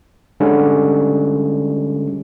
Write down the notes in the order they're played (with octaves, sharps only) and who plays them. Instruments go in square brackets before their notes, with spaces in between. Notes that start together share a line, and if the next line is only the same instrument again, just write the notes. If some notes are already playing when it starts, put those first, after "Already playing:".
[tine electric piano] D3 G3 G#3 C#4